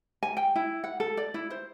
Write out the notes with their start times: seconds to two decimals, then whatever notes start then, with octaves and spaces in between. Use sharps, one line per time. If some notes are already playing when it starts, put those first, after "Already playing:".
0.23 G#5
0.37 G5
0.56 E4
0.84 F#5
1.00 A4
1.17 D5
1.34 E4
1.50 C5